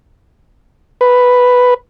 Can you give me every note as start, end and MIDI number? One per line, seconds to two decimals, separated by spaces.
1.01 1.74 71